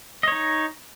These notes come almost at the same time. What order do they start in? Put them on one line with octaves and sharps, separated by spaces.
D#5 C#5 D#4